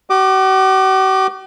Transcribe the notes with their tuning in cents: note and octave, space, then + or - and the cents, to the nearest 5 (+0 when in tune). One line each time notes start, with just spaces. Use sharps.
F#4 +45 D6 +30